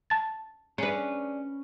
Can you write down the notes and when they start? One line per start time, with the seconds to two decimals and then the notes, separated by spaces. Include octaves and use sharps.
0.10 A5 A6
0.78 C#4 D4 G#4 B4